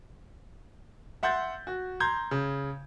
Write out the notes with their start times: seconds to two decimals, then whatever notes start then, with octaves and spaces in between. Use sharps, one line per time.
1.23 E5 F#5 C6 G6 A6
1.67 F#4
2.00 A#5 C6 G6 G#6
2.31 C#3